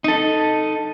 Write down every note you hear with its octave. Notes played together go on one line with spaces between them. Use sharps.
D#4 A4